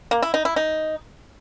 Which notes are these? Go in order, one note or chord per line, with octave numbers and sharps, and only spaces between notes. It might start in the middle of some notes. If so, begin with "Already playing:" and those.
A#3
E4
D#4
E4
D#4